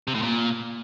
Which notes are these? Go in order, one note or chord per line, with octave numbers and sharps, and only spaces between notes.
C3
A2
A#2